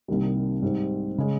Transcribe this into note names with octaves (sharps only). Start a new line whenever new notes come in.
C2 C3 D#3 G3 A#3
G#2 G3 C4
C#3 G#3